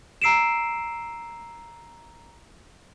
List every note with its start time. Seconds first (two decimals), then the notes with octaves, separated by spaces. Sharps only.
0.22 A#5 E6 C7 D7 E7